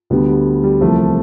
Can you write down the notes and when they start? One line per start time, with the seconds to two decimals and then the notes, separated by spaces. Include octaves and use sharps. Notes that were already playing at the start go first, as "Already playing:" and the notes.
0.10 D2 D3 G3 B3
0.28 G3
0.63 G3
0.81 C2 C3 E3 F3 A3